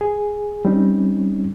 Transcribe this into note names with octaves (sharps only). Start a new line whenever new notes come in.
G#4
G3 C4 C#4 D#4